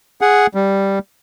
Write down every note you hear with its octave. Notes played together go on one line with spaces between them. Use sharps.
G#4 F#5
G3